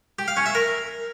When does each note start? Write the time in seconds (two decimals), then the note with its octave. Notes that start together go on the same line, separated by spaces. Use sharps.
0.19 G4
0.28 F5
0.37 C#4
0.46 E5
0.55 A#4